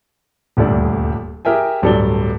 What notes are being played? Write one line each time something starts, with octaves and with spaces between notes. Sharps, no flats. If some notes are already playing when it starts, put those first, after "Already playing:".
D#1 D2 G2 A4 D5
G4 G#4 A#4 E5 G5 G#5
D1 G2 F#3 A4 D5 G7